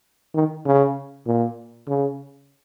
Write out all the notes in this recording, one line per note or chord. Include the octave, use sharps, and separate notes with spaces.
D#3
C#3
A#2
C#3